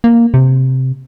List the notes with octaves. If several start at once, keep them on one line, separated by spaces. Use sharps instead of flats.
A#3
C3